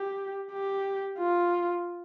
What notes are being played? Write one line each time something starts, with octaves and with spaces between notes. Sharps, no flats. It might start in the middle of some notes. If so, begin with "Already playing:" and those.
Already playing: G4
G4
F4